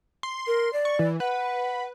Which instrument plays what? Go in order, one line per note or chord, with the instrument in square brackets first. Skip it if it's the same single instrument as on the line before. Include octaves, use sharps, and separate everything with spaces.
[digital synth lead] C6
[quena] A#4
D5
[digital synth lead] C#6
E3
[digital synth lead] B4 [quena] F#5